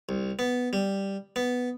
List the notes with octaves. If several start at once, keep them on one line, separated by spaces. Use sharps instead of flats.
C2
B3
G3
B3